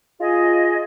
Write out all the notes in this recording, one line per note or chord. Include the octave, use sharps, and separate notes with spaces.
F4 G#4 D#5